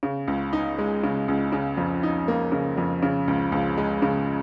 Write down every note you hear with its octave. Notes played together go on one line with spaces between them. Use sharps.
C#3
C#2
D#4
G#3
C#3
C#2
C#3
F2
D#4
A#3
C#3
F2
C#3
C#2
C#2
G#3
C#3